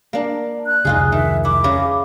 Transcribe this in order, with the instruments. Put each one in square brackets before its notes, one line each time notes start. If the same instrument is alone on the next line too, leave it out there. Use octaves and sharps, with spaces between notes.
[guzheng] A#3 D4
[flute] F#6
[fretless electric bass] F1 C#2 D3 [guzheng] D#4 F4 G#4
[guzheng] D#3 [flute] E5
[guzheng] E4 [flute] D6
[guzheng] C#3 B4 A#5